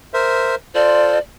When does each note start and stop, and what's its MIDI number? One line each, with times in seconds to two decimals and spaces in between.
0.14 0.55 70
0.14 0.55 72
0.14 0.55 76
0.75 1.19 65
0.75 1.19 69
0.75 1.19 72
0.75 1.18 74